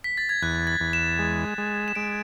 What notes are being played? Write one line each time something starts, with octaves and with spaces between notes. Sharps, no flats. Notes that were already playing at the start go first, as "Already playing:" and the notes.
B6
A6
G#6
E2 F#6
A6
E2
E7
G#3
G#3
E7
G#3 D7